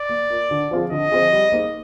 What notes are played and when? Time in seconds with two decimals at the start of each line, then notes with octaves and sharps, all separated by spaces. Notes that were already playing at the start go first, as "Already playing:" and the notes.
Already playing: D5
0.09 A#3
0.30 F4 A#4
0.51 D3
0.71 F3 C4 F4 G#4
0.91 D3 D#5
1.12 F3 C4 F4 G#4
1.33 G3
1.52 A#3 D#4 G#4 C5